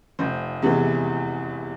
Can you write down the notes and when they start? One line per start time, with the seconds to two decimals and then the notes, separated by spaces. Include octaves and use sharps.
0.19 F1 C5
0.62 E2 C3 E3 G#3